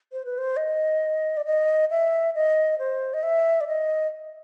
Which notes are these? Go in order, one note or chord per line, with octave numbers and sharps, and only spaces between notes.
C5
B4
C5
D#5
D5
D#5
E5
D#5
C5
D#5
E5
D5
D#5